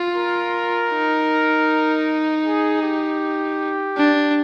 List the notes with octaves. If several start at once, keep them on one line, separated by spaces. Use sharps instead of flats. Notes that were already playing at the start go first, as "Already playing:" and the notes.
Already playing: F4
A#4
D#4
G#4
G4
D4